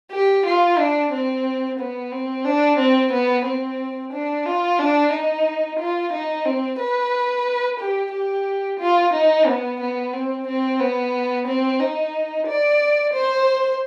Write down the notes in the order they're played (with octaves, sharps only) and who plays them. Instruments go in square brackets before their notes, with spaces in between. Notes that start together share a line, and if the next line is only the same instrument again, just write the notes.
[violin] G4
F4
D4
C4
B3
C4
D4
C4
B3
C4
D4
F4
D4
D#4
F4
D#4
C4
B4
G4
G4
F4
D#4
B3
B3
C4
C4
B3
C4
D#4
D5
C5